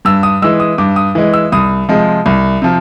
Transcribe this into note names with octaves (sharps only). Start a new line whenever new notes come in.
G2 E6
D#6
E3 G#3 E6
D#6
G2 D6
D#6
E3 G#3
E6
C2 D#6
C3 F3 G#3
C2
C3 F3